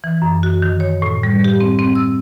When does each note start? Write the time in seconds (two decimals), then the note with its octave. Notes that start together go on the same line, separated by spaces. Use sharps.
0.04 E3
0.22 F#2
0.43 F#4
0.62 D#3
0.80 C#5
1.02 A2
1.23 G3
1.44 G4
1.60 C4
1.79 C4
1.95 E6